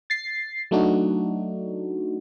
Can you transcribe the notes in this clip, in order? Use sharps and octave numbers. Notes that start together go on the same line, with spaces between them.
A6 C7
F#3 A3 D4 D#4 F#4